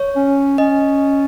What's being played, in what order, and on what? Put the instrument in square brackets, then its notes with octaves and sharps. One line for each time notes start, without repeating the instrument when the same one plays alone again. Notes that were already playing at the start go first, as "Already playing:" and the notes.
Already playing: [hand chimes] C#5
[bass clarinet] C#4
[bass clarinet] C#4 [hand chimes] D#5